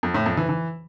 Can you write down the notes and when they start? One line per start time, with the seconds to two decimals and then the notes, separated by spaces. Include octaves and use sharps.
0.03 F2
0.14 A2
0.26 F2
0.37 E3
0.49 E3